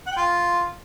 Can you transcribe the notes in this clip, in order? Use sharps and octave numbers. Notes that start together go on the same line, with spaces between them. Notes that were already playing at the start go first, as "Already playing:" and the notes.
F#5
G5
F4